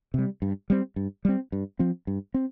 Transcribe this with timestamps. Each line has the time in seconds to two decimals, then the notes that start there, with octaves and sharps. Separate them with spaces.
0.14 C3 G3
0.42 G2
0.70 G3 C4
0.96 G2
1.25 G3 C4
1.52 G2
1.79 F3 C4
2.07 G2
2.34 C4